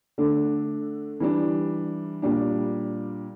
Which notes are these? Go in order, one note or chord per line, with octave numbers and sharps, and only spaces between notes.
D3 A3 D4
E3 G3 D4
A#2 G3 D4